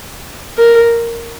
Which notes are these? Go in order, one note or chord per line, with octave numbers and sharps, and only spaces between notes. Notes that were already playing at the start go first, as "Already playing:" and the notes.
A#4